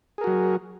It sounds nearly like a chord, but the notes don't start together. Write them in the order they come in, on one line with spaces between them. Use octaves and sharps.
G#4 A#4 F#4 F#3